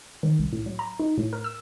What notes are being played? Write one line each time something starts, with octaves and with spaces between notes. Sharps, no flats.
D#3
C2
A2
F#3
A#5
D#4
A2
A#4
E6